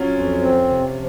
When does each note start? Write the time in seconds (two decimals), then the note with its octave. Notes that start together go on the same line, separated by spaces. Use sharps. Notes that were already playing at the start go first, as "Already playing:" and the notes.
Already playing: F#3 C#4 F4
0.10 F2
0.38 C4
0.66 C3
0.94 F3